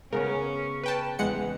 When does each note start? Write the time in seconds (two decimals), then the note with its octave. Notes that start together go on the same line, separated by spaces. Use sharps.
0.13 C#3 B3 C#4 A#4 C#5
0.84 B4 G5 A5
1.19 E2 G#3 F#5 C#7